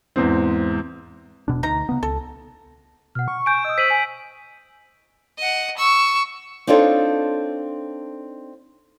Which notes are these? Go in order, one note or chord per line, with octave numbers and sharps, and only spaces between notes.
E2 G#2 C4
E1 B2 D4
D2 D#4 A#5
C#3 B3
C#2 A4
B2 F#5 F6
C#6
G#5 G6 D7
D#5 D#6 E6
C5 B6 D#7 F#7
G#5
D#5 F#5
C#6 E6
C4 D4 D#4 F4 A4 C#5